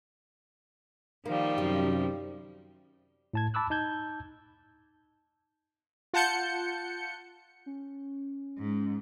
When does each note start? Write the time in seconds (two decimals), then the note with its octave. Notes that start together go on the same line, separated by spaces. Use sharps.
1.26 D#3 F3 G3 A#3
1.58 F#2 C3 G4
3.33 A2 A5 G#6
3.54 A5 B5 D6 E6 F#6
3.70 D#4 A5 G6 G#6
6.13 F4 F#5 A5 G6 C#7
7.66 C#4
8.59 G#2